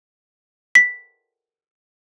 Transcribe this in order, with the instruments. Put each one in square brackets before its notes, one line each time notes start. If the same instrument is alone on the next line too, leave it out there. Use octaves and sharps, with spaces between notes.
[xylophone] B6